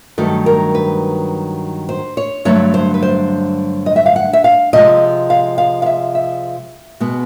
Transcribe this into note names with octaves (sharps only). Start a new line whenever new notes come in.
G2 D#3 F#3 A3 A4
A#4
B4
C5
C#5
G2 D3 F#3 A3 C#5
C5
B4
C5
D#5
E5
F5
F#5
E5
F5
C3 F3 G#3 D#5
F5
F5
F5
E5
E5
B2 G#3 B3